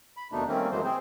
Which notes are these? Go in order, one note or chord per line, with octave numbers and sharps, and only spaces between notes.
B5
D#2 B2 A3 D4 D#4
D#3 G3 A3 A#3 C4 C#4
F#2 E3 F#3 G#3 A3 C5
C3 C4 G#4 C5